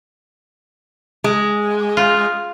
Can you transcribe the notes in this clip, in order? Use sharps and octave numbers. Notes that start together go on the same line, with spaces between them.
G#3
F4